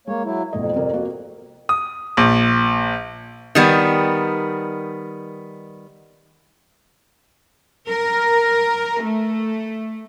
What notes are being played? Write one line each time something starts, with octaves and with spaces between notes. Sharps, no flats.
G#3 A#3 C#5
F#3 E4
B1 F2 A3 D#5
C3 A#4 D5
A#3 F#4
D#6
A#1
D#3 G3 B3
A#4
A3